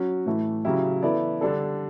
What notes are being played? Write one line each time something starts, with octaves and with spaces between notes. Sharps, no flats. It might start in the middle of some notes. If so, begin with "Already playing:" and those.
Already playing: F#3 C#4 F#4
A2 E3 A3 E4
C#3 F#3 C#4 E4 G4
E3 B3 E4 A4 D5
D3 G3 D4 A4